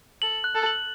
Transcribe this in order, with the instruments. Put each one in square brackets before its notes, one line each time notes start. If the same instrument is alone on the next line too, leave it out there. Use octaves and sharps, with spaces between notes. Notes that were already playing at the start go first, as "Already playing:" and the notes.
[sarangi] A4 [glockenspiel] F#7
[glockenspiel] F#6
[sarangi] A4
[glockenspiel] F#7